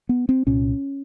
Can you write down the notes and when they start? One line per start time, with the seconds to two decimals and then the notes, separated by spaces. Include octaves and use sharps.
0.09 B3
0.29 C4
0.47 C2 A#2 C#4